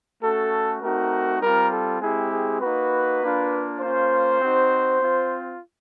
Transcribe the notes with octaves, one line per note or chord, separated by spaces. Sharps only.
A3 C#4 F#4 A4
A3 C4 D#4 F#4 A#4
G3 C4 F4 A#4
A4
G#3 C4 E4 G4 G#4
G#4
A#3 D#4 F#4 B4
A#3 D4 F4
A#3 C#4 F4 C5
C4 D#4 F#4
C4 F4